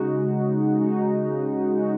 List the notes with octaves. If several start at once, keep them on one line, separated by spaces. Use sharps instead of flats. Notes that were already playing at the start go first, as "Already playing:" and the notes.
Already playing: C#3 G#3 D#4 F#4
C#3
G#3 D#4 F#4
C#3
G#3 D#4 F#4